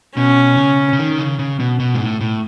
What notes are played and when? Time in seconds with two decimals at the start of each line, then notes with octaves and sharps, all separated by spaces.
0.17 B2 C#4
0.57 C#3
0.93 C#3
0.99 D#3
1.19 C#3
1.39 C#3
1.60 B2
1.80 B2
1.95 G#2
2.00 A2
2.21 A2